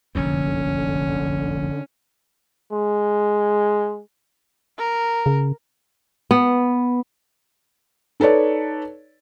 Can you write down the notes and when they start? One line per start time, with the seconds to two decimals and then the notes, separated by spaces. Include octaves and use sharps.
0.15 F1 A#1 F#2 D3 C#4
2.73 G#3
4.78 A#4
5.26 C#3
6.31 B3
8.20 D#4 A4 B4 C#5 D5